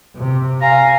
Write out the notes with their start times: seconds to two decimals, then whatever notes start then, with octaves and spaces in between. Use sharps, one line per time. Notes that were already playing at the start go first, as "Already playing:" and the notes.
0.16 C3
0.61 F5 G#5 A#5